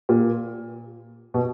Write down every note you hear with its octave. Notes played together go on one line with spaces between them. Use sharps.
A#2
B2